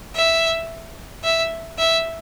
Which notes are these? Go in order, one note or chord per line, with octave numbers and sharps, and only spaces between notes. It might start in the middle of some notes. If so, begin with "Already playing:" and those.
E5
E5
E5